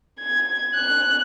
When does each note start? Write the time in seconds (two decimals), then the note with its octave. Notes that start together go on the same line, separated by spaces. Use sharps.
0.20 G#6
0.75 F#6